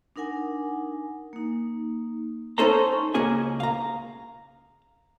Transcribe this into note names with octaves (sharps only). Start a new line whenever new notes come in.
D4 D#4 A#4 F#5 G#5
A#3 D#4
C#4 D#4 A4 C5 C#5 A#5
C#2 A#3 C#4 G#4 D#5 G#5
F5 A#5